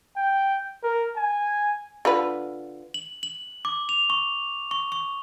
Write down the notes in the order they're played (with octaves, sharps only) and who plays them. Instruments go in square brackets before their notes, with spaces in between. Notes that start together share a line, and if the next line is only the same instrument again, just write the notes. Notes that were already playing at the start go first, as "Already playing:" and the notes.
[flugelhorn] G5
A#4
G#5
[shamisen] D3 F4 B4
[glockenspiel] F#7
F#7
D6
F7
C#6
C#6
C#6